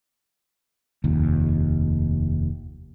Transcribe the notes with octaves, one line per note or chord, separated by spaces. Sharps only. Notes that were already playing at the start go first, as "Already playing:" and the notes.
F1 D#2